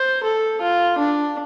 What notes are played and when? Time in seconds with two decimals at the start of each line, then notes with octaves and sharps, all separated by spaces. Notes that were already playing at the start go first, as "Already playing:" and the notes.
Already playing: C5
0.23 A4
0.61 F4
0.98 D4